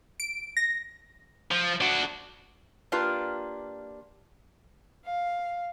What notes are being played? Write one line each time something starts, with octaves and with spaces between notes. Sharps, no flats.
D7
A#6
F3
D4 F#4
A#3 D4 F4 G4 B4
F5